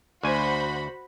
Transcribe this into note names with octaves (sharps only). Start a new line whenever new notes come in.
D2 F#4 C5 G#5 B5